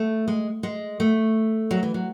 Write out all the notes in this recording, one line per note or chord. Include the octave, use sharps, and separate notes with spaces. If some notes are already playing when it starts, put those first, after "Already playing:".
Already playing: A3
G#3
G#3
A3
F#3
E3
F#3